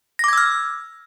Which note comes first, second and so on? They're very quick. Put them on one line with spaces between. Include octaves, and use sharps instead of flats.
A#6 D6 G#6 E6 F6